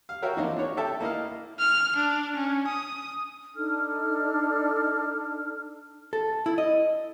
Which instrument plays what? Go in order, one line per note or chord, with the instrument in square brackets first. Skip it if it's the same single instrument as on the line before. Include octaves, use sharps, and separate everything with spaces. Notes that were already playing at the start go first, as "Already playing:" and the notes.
[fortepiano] F5
F#4 A#4 C#5 E5 G5
F3 A#3 D4 D#4
D4 C#5
A4 E5 G5 A5
A#3 E4 D#5 F5
[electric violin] F6
D4
C#4
D#6
[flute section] D4 D#4 A4 F6
[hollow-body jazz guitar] A4
E4
D#5